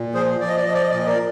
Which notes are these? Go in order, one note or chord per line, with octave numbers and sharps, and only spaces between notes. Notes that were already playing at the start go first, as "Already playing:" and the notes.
Already playing: A#2
F3 G#4 C5
F3 D5
D#5
D5
F3 D#5
D5
D#5
A#2 D5
D#5
A#4 D5